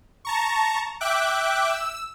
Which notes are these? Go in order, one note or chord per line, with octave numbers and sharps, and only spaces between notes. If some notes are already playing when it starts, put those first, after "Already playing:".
A5 A#5 C#6
E5 G5 D6 F#6
E6